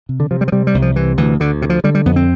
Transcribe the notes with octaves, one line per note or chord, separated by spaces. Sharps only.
C3
D3
C3 F3
G3
F3
C3 G3
G3
C2
F3
C3 E3
D2 E3
D2 D3
C3
F3
D3 G3
G3
F2 B3
C4